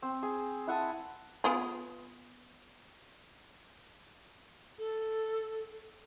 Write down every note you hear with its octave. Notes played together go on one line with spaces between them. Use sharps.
C4
G#4
E4 F#5 G#5 A5
B3 F4 G#4
A4